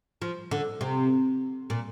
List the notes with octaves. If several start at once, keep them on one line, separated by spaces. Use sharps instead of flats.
F3
D3
C3
A#2